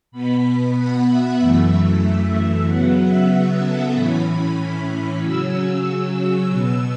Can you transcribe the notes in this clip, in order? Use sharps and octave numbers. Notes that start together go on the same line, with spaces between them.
B2 B3 B5
F#5
E5
F#2 E3 A3
C#3 F#3 B3 F#5
E5
E5
A4
A2 E3 C#4 B5
C#3 F#3 C#4 E6
E6
B2 B3